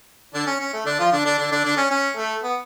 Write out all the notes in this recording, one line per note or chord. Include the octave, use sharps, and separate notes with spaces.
D3 D4
C#4
C#4
A3
D3 D4
F3 F4
D3 D4
D3 D4
D3 D4
D3 D4
D3 D4
C#4
C#4
A3
B3